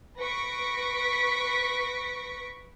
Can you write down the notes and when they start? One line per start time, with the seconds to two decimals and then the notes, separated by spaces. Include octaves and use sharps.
0.18 B4 C#6 A#6 B6 D7